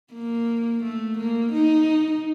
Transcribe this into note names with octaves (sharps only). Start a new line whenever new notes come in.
A#3
A3
A#3
D#4